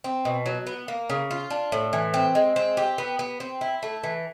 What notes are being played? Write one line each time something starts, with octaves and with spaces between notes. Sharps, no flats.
C4
B2
F#3
B3
A#3
C#3
F4
D4
A2
E3
C4
G#3
C4
G4
B3
B3
C4
E4
A3
E3